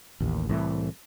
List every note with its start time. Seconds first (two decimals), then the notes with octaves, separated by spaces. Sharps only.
0.20 A1 D#2
0.49 C2 A2 E3 A3